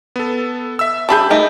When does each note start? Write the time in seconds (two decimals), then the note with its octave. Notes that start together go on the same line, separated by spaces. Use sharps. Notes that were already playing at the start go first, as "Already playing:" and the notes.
0.16 B3 A4
0.79 E5 E6
1.09 G3 D4 G#4 A5 B5 G6
1.30 A3 D#4 A#4